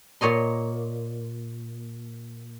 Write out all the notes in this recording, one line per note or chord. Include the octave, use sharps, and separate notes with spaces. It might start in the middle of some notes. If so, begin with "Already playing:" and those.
A#2 C#5 D#5 C6